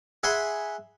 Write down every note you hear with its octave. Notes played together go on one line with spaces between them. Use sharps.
G#4 E5 F#5 G#5 B5 C6